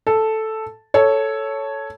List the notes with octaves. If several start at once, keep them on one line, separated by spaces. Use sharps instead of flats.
A4
A4 C#5